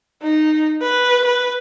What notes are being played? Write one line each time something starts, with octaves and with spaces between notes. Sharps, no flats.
D#4
B4
B4